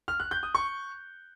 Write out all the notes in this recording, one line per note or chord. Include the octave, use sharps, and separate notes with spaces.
F6
F#6
G6
D#6
C#6